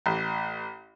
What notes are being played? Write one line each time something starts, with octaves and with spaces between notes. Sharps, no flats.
A1